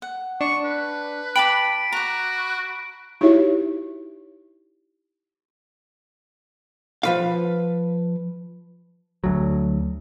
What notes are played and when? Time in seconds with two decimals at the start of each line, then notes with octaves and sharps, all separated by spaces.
0.02 F#5
0.41 D4 C#6
0.64 B4
1.36 G5 A5 B5 D6 D7
1.92 F#4 A#5 D6
3.21 D#4 E4 F#4 G4 C#5 E5
7.03 F3 B4 F5
9.24 D2 F#3